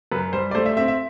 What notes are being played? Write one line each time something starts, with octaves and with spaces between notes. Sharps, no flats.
F#2 B4
G3 C5
D5
A3 C5
E5
C4 E5
E5